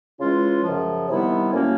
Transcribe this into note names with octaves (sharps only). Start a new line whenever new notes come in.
C#3 E3 G#3 C#4 F4
F#2 C#3 F3
C3 D#3 G3 B3 E4
A2 F#3 A#3 C#4